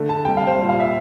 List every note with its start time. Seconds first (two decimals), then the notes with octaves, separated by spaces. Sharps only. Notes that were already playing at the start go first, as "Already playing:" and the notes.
Already playing: D3 A3
0.09 A5
0.25 C3 G3 G5
0.37 F5
0.47 C5
0.58 A#2 G3
0.69 F5
0.80 E5